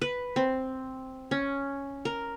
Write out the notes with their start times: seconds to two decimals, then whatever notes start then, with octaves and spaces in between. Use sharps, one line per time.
0.02 B4
0.36 C4
1.31 C#4
2.05 A#4